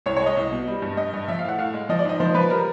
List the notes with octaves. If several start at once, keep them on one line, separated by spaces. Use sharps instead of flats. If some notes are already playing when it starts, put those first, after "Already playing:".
C2 C#5
G#3 C#5
D#5
C2
B2
G3
G2
G2 D#5
G2
F3 E5
F5
A2 F#5
A2 F5
G#3
F3 D#5
D5
G#2 D#5
F3 C5
F3 B4
G3 A#4